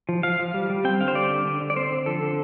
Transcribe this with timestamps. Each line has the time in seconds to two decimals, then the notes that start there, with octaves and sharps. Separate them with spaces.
0.09 F3
0.23 F3 F5
0.39 F3
0.54 G3
0.70 G3
0.84 C4 G5
1.00 D3 F5
1.08 C5
1.15 G3 D5
1.30 D3
1.45 D3
1.61 D3
1.70 D5
1.76 C4 C5
1.92 D3
2.06 F3 A4
2.22 D3